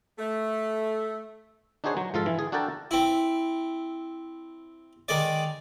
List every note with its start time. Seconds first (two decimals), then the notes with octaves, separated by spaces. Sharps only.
0.18 A3
1.84 D4 D#4 F#4 G#4 C5 C#5
1.97 F#3
2.14 G#2 F3 F4 A4 F5 A5
2.26 E3
2.39 G#4
2.52 D4 F#4 A4 A#4 G5 A5
2.91 C4 E4
5.08 D#3 G#3 D5